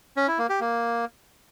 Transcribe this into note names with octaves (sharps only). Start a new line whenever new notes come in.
C#4
E4
A#3
G4
A#3